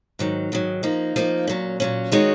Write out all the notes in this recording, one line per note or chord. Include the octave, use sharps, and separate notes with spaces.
G#2 D#3 F#3
G#2 D#3 F#3
F3 A#3 D#4
F3 A#3 D#4
A#2 F#3 C#4
A#2 F#3 C#4
D#3 G#3 D#4 F#4 C#5